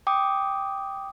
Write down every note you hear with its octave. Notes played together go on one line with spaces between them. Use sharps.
G5 D6 D#6